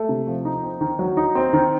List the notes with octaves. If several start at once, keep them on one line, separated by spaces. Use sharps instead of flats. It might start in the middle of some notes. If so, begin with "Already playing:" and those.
Already playing: A3
C3
F3
D#4
C4
D#3
F#3
D#4
C4
D#3